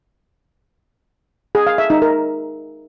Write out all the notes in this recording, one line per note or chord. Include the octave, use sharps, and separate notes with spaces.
G#4
F5
E5
D#4
A#4